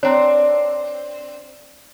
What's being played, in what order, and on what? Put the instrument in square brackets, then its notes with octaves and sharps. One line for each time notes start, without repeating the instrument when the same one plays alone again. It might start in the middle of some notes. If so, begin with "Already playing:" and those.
[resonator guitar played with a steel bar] C4 D4 [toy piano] C#5 A#5